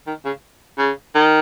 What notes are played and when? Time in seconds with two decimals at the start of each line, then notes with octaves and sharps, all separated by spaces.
0.07 D#3
0.25 C#3
0.79 C#3
1.15 D#3